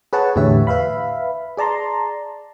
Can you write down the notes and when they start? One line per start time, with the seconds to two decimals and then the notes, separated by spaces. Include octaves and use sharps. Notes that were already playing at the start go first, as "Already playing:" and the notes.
0.13 G#4 B4 C#5 F#5 A5
0.36 E2 A2 D3 G4 C#5 E5
0.67 B4 E5 F5 B5
1.57 G#4 D5 A5 A#5 C6